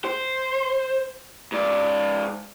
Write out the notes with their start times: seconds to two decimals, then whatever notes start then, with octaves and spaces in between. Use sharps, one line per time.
0.05 C5
1.52 G#2 D5